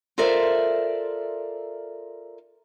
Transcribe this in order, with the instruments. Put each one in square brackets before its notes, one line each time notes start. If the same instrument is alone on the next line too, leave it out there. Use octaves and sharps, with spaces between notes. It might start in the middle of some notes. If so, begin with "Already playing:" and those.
[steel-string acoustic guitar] F4 A4 A#4 C5 D5 E5